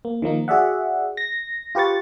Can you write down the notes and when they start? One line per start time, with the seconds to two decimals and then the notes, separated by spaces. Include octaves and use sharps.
0.05 A#3
0.22 D#3 F3 A#3 D#4
0.48 F#4 G#4 D5 E5 F#5
1.17 A#6
1.75 F4 G4 B4 C#6 A6